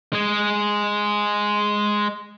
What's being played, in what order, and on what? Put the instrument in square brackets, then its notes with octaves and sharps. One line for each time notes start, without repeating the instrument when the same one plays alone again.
[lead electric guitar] G#3 G#4